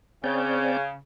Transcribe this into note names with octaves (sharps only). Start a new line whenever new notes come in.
C#3 C4 D5 G6